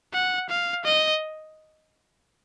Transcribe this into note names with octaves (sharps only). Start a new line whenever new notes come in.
F#5
F5
D#5